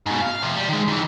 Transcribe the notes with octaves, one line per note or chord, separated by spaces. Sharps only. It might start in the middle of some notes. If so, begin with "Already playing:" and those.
G#2 B2
F5
C3 F3
G3
D#3 G#3
D#3 E3